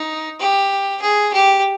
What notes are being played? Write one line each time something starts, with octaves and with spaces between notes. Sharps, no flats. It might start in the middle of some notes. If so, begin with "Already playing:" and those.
Already playing: D#4
G4
G#4
G4